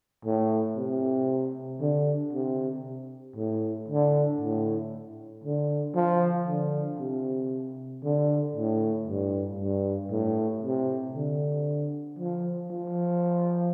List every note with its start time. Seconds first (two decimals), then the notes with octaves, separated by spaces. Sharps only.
0.25 A2
0.76 C3
1.81 D3
2.33 C3
3.36 A2
3.89 D3
4.41 A2
5.44 D3
5.95 F3
6.48 D3
6.99 C3
8.04 D3
8.56 A2
9.08 G2
9.59 G2
10.11 A2
10.63 C3
11.15 D3
12.19 F3
12.71 F3